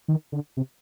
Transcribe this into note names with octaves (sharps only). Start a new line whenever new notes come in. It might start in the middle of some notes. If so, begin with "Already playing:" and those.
D#3
D3
C3